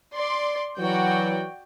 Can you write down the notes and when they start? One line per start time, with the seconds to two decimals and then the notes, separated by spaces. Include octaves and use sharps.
0.13 D5 C6
0.78 E3 F#3 F#4 D5 G5